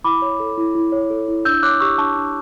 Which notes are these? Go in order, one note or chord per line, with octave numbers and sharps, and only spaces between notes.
E4 B5 D6
C#5
A4
E4
E4
C#5
A4
E4
D4 E6 G6
C#5 D6 F#6
G4 C#6 E6
D4 A5 C#6
D4